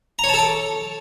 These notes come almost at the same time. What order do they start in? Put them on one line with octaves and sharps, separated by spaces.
A#5 C#5 A5 A4 D6